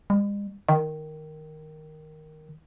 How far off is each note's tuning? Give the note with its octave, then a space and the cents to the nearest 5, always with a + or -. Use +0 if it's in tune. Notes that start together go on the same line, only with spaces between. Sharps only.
G#3 -45
D#3 -5